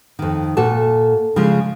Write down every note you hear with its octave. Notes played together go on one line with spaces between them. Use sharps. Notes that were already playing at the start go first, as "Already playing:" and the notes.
F2 D#3
A#2 F#4 A4 A5
C#3 F3 G#3